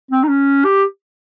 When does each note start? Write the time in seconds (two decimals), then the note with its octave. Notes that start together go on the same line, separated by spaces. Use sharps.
0.11 C4
0.23 D#4
0.29 C#4
0.65 G4